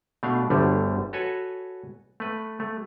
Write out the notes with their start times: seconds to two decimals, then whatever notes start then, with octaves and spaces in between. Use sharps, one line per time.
0.23 B2 A3 D4 F5
0.50 G1 D2 D3 G3 A3
1.13 F#4 A4 B4 C#5 G#5
2.20 A3 B4
2.60 A3